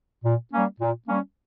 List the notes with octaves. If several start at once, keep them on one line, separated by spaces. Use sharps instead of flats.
A#2
G3 A#3 C#4
A#2
G3 A#3 C#4